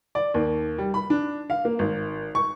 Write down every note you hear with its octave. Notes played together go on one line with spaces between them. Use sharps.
D5
D#2
G3
B5
D4
F5
A#3
G#1
C#6